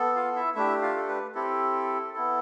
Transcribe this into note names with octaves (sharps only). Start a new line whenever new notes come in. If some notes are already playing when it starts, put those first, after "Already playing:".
Already playing: B3 A4
F4 F5
E4 E5
A3 D4 E4 G4 E5
F4 F5
A4
B4
C4 E4 G4 A4
B3 E4 A4